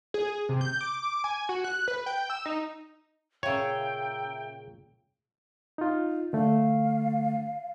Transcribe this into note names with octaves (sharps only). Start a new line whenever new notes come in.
G#4
C3
G6
D6
G#5
F#4
F#6
B4
G5
E6
D#4
A#2 C#3 C#5 E5 G5 A#5 E6
D#4 F4
D3 A3 F5